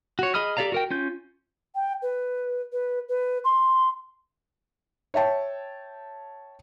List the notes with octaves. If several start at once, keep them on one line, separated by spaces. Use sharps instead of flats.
F#4 C#5
G#4 D#5 B5 D#6 F6
G4 A4 D5 F5 A#5
F#4 A#4 G5
C#4 F4 G6
G5
B4
B4
B4
C6
C#5 E5 G5 A5